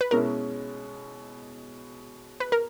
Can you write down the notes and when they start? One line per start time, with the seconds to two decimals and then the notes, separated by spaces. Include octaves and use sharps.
0.01 B4
0.11 B2 G#3 C#4 E4 A#4
2.40 B4
2.52 A#4